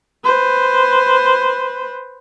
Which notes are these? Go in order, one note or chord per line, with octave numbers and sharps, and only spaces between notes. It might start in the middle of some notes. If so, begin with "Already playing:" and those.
B4 C5